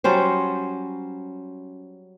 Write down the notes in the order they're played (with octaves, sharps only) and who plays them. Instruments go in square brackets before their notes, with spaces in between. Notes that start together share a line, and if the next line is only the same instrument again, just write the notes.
[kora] F#3 G3 C#4 C5